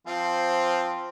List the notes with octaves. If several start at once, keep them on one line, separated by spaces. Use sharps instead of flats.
F3 C4 F4